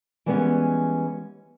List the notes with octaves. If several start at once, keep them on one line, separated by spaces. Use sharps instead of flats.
E3 G3 G#3 A#3 B3 C#4